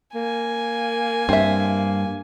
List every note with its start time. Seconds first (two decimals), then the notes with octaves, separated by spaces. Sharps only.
0.15 A#3 G#5
1.29 G2 A#3 C4 E5